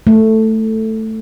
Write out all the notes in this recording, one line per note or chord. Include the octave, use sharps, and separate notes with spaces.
A3